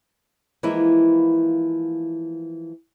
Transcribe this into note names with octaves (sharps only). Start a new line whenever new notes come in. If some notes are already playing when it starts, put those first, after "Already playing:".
E3 F3 G#3 A#3 E4